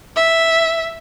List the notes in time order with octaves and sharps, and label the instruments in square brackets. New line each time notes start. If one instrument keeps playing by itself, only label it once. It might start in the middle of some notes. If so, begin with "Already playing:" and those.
[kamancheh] E5